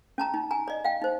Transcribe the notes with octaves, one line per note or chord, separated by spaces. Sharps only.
C#4 A5 A#5
D#4
G#5 A#5
D5 D#5
F5 G5
D#4 C5